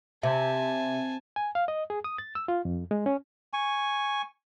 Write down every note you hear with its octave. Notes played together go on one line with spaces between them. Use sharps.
C3 E5 G#5 A5
G#5
F5
D#5
G#4
D#6
A6
E6
F4
F2
G#3
C#4
G#5 C#6